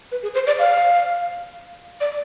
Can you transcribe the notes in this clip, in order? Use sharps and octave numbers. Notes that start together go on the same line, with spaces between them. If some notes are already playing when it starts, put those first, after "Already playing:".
B4
G#4
C5
D5
F5
D5